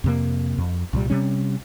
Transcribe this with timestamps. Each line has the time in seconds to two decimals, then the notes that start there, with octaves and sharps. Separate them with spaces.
0.04 F2 C3 A#3
0.58 F2
0.93 C2 A#2 G3
1.10 C3 G3 C#4